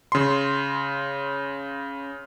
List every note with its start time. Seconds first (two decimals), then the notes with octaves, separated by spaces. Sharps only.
0.12 C#3 C6